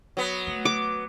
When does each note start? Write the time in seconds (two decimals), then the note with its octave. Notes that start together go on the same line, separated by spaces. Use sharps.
0.17 F#3 B3
0.47 A3
0.65 D6